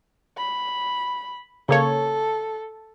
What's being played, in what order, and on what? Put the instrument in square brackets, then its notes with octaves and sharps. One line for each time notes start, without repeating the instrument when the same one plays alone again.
[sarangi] B5
[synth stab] C#3 A#3 C#5 [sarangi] A4